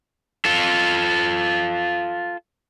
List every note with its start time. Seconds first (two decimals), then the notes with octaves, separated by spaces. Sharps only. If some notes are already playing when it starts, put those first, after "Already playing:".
0.45 F4 A4